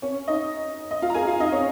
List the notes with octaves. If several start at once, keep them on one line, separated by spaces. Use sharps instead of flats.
C#4 C#5
D#4 D#5
D#5
F4 F5
A#5
G#4 G#5
F4 F5
D#4 D#5
C#4 C#5